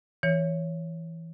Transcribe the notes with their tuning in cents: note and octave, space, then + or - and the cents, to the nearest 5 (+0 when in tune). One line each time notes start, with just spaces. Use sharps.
E3 +0 C#5 +0